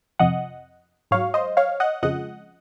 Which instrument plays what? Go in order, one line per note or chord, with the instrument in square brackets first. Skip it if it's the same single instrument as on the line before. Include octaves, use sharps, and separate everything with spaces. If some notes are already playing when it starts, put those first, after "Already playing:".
[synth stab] F2 C3 F3 D#5 F#5
G#2 F#3 C#5 F5
C5 D#5
C#5 F5
D#5 F#5
F2 C#3 F3 G#3 D#5 F#5